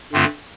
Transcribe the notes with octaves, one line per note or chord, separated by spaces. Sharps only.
G2 D3 A3 C4 F4